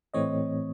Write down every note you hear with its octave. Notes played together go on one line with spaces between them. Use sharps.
A2 E3 A3 C4 C#5 D#5